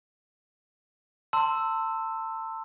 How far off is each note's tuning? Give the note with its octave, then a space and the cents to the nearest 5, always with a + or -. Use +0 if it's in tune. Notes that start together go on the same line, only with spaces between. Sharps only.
A5 +30 C6 +0 E6 +0